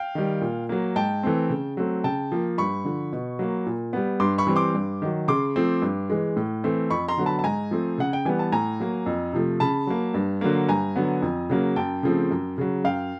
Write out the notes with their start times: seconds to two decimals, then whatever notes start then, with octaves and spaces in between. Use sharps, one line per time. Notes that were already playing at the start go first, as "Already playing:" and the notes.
Already playing: F5 G5
0.15 D#3 G3
0.41 A#2
0.69 F#3 A#3
0.96 G#2 G5 A5
1.23 E3 A3 C4
1.50 C#3
1.77 F#3 A3 C4
2.04 C#3 G5 A5
2.32 F3 A#3
2.58 G2 B5 C#6
2.85 D3 F3
3.13 B2
3.39 F#3 A#3
3.66 A#2
3.93 G3 B3
4.20 G2 C6 D6
4.38 B5 C#6
4.47 E3 G3 C4
4.56 C6 D6
4.74 G2
5.02 D#3 F#3
5.28 C#3 C6 D6
5.56 F3 A3 C4
5.82 G2
6.10 E3 G#3
6.36 A2
6.64 E3 A3 C4
6.90 F2 B5 C#6
7.08 A#5 C6
7.17 D3 F#3 B3
7.26 A5 B5
7.39 A5
7.44 G#2 G#5 A#5
7.71 F3 A3 C4
7.98 C#3 F#5
8.13 G5
8.25 E3 G3 B3 G#5
8.39 A5
8.52 A2 G#5 A#5
8.80 F#3 A#3
9.06 F2
9.33 C3 F3 A3
9.60 C#3 A5 B5
9.87 F#3 A#3
10.14 G2
10.41 D3 F#3 A#3
10.68 G2 G#5 A#5
10.96 D3 F#3 B3
11.22 F2
11.50 C#3 F#3 A#3
11.76 F#2 G5 A5
12.03 C#3 F3 A3 C4
12.31 F#2
12.58 C#3 F#3
12.84 F#2 F5 G5